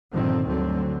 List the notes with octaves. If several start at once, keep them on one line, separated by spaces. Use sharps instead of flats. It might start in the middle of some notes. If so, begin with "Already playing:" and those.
G1 A#2 D3 D#3 F3 C4
D2 G2 D3 F#3 C4